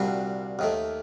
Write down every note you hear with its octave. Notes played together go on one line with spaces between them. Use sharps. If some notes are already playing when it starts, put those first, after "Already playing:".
Already playing: C2 A#2 G3 D4 F#4
D#2 D#3 A3